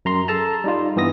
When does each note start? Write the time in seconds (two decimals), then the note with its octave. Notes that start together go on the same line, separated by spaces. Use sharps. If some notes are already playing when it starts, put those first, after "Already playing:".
0.05 F#2 A#5 C6
0.28 G#4 A4 A5 A#5
0.64 G3 D#4 F4
0.96 G2 E3 B3 D#6 A#6